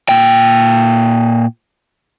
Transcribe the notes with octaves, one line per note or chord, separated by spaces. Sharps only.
A#2 G5